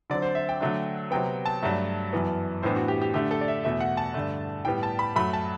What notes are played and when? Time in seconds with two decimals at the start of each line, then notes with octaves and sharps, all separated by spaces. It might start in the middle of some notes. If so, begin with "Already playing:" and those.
0.10 D3 F#3 C4 D5
0.22 C5
0.35 E5
0.49 G5
0.61 D3 F#3 A3 D4
1.11 C3 F#3 B3 G5
1.46 A5
1.63 G2 F#3 A3
2.13 F#2 E3 B3
2.62 A2 E3 B3 D4 C5
2.76 F#4
2.88 G4
3.02 G4
3.14 D3 A3 D4 G4
3.31 A4
3.41 D5
3.48 E5
3.64 E2 B2 A3 E5
3.80 F#5
3.97 A5
4.14 G2 D3 A3
4.65 A2 G3 B3 G5
4.83 A5
4.99 B5
5.16 F#2 F#3 A3 B5
5.33 A5